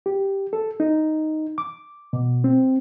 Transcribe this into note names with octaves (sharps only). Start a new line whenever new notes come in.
G4
A4
D#4
D6
B2
C4